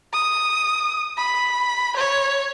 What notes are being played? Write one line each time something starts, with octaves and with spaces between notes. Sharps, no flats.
D#6
B5
C#5